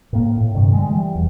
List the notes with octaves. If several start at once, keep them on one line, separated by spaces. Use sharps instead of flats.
A2 A#3
A2
G2 C3 D#3
D3 F3 G3 G#3
E3 G3
E1 E2